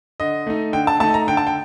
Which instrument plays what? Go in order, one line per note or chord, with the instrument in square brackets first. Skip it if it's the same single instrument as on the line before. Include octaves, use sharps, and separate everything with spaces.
[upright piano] D3 D#5
A3 D#4
D3 G5
A5
A3 D#4 A5
A#5
D3 G5
A5
G5